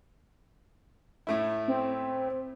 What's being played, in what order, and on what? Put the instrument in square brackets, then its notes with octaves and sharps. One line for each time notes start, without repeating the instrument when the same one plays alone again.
[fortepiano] A2 A3 E4
[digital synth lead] C4